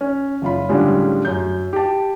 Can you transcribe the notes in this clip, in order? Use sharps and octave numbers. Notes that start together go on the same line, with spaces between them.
C#4
F#1 F4 B5
A2 D3 F3 G3 G#3 C#4
F#2 G6
G4 A5